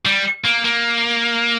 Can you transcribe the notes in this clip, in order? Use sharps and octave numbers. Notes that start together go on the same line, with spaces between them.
G3
A#3
A#3